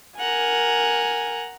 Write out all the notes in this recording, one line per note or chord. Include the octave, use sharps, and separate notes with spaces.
A#4 F#5 G#5 A#5